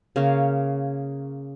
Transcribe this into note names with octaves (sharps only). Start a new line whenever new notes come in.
C#3 A#3 C#5 F5